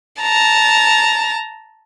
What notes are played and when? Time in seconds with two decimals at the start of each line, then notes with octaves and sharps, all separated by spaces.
0.21 A5 A#5